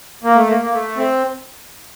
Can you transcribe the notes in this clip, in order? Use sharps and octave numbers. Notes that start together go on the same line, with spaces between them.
A#3
A3
A#3
A#3
A3
C4